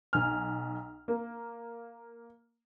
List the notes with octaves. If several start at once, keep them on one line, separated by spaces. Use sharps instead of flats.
B1 G#5 F6
A#3